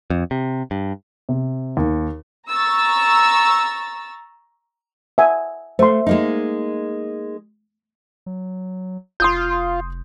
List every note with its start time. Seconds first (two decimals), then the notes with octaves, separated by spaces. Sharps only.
0.10 F2
0.31 C3
0.71 G2
1.29 C3
1.77 D#2
2.49 A#5 C#6 E6 A6
5.18 E5 F#5 G#5
5.79 A3 C5 C6
6.07 G#3 A#3 D#4
8.26 F#3
9.20 F1 F4 C6 D#6 G6